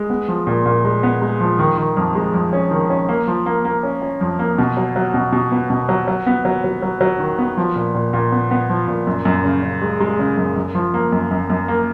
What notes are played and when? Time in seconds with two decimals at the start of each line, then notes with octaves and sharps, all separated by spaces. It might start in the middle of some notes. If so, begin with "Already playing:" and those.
Already playing: G#3
0.10 B3
0.28 F3
0.47 A#2
0.66 A#2
0.85 G#3
1.03 B3
1.22 G#3
1.41 F3
1.59 D#3
1.77 D#3
1.97 F2
2.15 G#3
2.34 F2
2.53 C#4
2.71 D#3
2.90 C#4
3.09 A#3
3.27 F3
3.46 A#3
3.65 A#3
3.83 C#4
4.02 C#4
4.21 F2
4.39 A#3
4.58 B2
4.77 F#3
4.96 F#3
5.14 B2
5.32 B2
5.52 B3
5.70 B2
5.89 F#3
6.08 F#3
6.26 B3
6.45 F#3
6.64 F#3
6.82 F#3
7.01 F#3
7.19 D#3
7.39 B3
7.57 F3
7.76 A#2
7.95 A#2
8.13 A#2
8.32 B3
8.51 B3
8.69 F3
8.88 A#2
9.07 F#2
9.25 F#2
9.44 C#3
9.63 C#3
9.82 G#3
10.01 G#3
10.19 C#3
10.37 F#2
10.56 F#2
10.75 F3
10.94 A#3
11.12 F#2
11.31 F#2
11.50 F#2
11.68 A#3